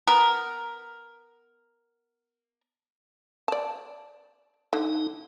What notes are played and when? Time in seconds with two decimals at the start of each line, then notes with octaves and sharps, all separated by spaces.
0.07 B3 A#4
3.48 D5 A5
4.73 D3 D#4